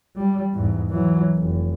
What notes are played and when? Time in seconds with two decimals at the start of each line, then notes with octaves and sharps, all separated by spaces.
0.15 G3
0.53 E2 G#2
0.90 E3 F#3
1.36 F1